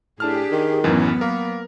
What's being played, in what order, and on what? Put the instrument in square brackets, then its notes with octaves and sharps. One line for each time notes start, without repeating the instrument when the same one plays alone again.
[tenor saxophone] A2 [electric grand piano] D4 A5 F6 [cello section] G4 G#4
[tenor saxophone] D#3
[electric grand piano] A1 F#2 E3 [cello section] F#3 B3
[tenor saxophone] A#3 [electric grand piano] A#4